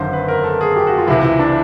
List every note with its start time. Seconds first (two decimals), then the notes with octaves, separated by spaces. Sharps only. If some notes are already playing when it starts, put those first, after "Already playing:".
Already playing: G#1 F#2 D3 C5
0.13 B4
0.28 A#4
0.44 A4
0.61 G#4
0.76 G4
0.87 F#4
0.98 F4
1.08 C#2 C3 E3 E4
1.24 E4
1.39 D4